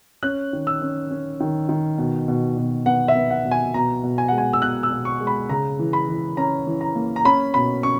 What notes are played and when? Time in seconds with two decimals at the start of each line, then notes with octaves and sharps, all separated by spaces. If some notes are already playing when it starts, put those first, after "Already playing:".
0.23 C#4 F#6
0.53 D#3
0.67 E6
0.82 C#4
1.11 C#4
1.40 D#3
1.69 D#3
1.98 B2
2.28 B2
2.57 B2
2.86 B3 F#5
3.08 E5
3.15 B3
3.30 F#5
3.45 B2
3.51 G#5
3.74 B2 A#5
4.03 B2
4.18 G#5
4.28 G#3 F#5
4.38 G#5
4.53 E6
4.62 B2 F#6
4.83 E6
4.91 B2
5.05 C#6
5.20 G#3
5.27 B5
5.49 C#3 A#5
5.79 E3
5.93 B5
6.08 E3
6.37 C#4 A#5
6.67 E3
6.81 A#5
6.96 A#3
7.16 A#5
7.25 C#4 B5
7.54 B2 B5
7.83 C#4 C#6